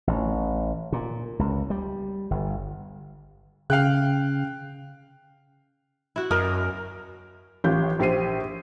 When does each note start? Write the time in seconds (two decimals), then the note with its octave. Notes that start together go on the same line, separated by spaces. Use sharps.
0.07 A1
0.92 A#2
1.39 C#2
1.70 G3
2.31 G1
3.70 C#3 F5 G5 F#6
6.16 E4 F#4
6.31 F#2 A#4 D#5
7.64 A1 F4 G4 G6
7.99 A#1 G4 C5 C7 D#7